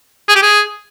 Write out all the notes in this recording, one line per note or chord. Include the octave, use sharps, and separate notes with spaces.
G#4
G4
G#4